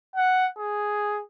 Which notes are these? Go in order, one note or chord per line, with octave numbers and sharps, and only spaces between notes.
F#5
G#4